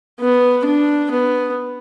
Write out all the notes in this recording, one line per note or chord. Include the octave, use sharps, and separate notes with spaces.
B3
D4
B3